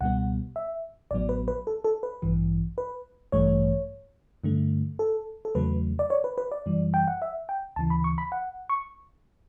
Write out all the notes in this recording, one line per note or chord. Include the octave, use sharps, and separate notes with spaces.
C#2 B2 G3 B3 F#5
E5
A1 A2 F#3 B3 D5
B4
B4
A4
A4
B4
A1 G2 E3
B4
A1 G2 E3 A3 C#5
G2 D3 A3
A4
A4
E2 C#3 F#3 A3 B4
D5
C#5
B4
B4
D5
F#2 E3 G3
G5
F#5
E5
G5
D2 C#3 E3 A5
B5
C#6
B5
F#5
C#6